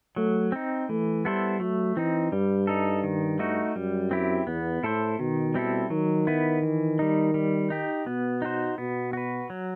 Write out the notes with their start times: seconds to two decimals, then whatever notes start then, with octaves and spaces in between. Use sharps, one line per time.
0.16 F#3 A3
0.52 C4 D#4
0.89 E3 A3
1.25 G3 B3 E4 A4 C5
1.60 F#3 A3
1.96 E3 C4 D#4
2.32 G2 G3
2.67 D#4 A4
3.03 D#3
3.39 A3 D#4 F#4
3.76 F#2 G3
4.11 C4 E4 G4
4.47 E2 B3
4.83 A2 E4 A4 C5
5.19 B2 D#3
5.54 G3 C4 E4 A4
5.90 D#3 F#3
6.27 B3 E4 B4
6.62 E3
6.99 G3 D#4
7.34 G3
7.70 D#4 G4
8.06 B2 B3
8.42 D#4 F#4 C5
8.78 B2 B3
9.13 F#4 B4
9.50 F#3